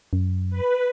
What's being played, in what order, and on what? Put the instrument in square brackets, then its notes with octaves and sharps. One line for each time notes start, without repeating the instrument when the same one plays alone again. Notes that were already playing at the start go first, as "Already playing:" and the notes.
[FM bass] F#2
[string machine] B4